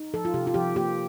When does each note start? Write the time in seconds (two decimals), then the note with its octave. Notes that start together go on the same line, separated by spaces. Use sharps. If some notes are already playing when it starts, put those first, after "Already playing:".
Already playing: D#4
0.14 F3 A4
0.25 F4
0.34 C3 G4
0.47 F4
0.54 F3 G4
0.75 A#3 G4